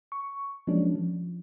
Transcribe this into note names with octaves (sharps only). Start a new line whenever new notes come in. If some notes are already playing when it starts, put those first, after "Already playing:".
C#6
F3 F#3 G#3 A#3 C#4 D4
F3